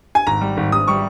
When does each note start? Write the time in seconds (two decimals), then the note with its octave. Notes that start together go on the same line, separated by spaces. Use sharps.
0.15 G#5
0.27 G#1 A#5
0.41 G3
0.57 G#1
0.72 G#1 D#6
0.88 G3 C#6